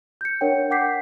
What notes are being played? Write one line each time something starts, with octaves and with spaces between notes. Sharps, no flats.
G6 C#7
D4 A#4 C#5 F#5 G5
F#5 G5 D6 G6 B6 C7